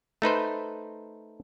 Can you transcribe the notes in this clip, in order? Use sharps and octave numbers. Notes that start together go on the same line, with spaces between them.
A3 D#4 B4 C5